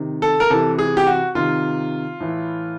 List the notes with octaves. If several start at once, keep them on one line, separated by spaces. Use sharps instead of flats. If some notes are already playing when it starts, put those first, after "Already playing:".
Already playing: C3 D#3
A4
A#4
C3 E3 A4
G#4
G4
F#4
C3 D#3 F4
A2 E3